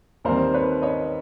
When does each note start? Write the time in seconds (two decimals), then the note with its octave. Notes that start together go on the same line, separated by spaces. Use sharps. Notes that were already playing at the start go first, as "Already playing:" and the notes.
0.24 D#2 D#3 G3 C4 A#4 C5
0.54 B4 C#5
0.82 C#5 D#5